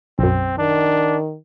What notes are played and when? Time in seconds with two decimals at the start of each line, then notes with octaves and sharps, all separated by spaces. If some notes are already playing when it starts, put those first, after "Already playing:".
0.19 B1 F#2 C4
0.58 D#3 D4